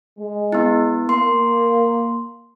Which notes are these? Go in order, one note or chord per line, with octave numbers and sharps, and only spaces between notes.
G#3
B3 E4
A#3 C6